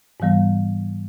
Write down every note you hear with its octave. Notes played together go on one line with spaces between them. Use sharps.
G#2 E3 G3 B3